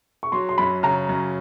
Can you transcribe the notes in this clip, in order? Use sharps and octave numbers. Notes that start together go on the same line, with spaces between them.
C#6
F#3 C6
C6
F#2 B5
C#3 A#5
F#2